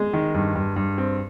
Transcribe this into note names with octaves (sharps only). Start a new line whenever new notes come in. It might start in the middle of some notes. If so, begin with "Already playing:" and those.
Already playing: G#3
D#3
G2
G2
G2
C4